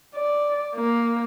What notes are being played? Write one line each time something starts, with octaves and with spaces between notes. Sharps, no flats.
D5
A#3